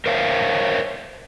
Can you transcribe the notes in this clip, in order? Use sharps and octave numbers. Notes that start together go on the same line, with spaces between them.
A#4 C5 C#5 E5 F5